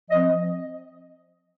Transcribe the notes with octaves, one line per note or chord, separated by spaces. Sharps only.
F3 C4 D#5